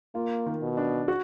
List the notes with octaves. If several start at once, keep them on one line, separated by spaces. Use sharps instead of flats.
A#3 F4
D#3
B2
D4
F#4